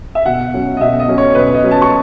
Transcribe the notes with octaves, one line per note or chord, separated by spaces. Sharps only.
E5
B2 F#5
F#3 C#4
D#5
B2 E5
D#5
F#3 C#4
C#5
B2 B4
D#5
F#3 C#4
A5
C#6